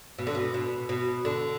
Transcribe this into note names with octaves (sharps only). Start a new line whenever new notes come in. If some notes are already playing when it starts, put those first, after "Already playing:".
B2
D3
B2
B2
B2
D3